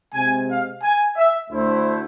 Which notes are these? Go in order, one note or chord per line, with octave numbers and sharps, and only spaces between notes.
C3 G#3 C4 G#5
F5
G#5
E5
D2 D3 A3 E4 C5